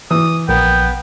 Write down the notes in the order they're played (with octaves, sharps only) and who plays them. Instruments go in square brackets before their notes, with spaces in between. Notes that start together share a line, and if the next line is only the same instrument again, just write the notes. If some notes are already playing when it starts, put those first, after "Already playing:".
[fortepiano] E3 [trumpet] D#6
[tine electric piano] A#1 [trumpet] B3 [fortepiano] A#4 [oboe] G5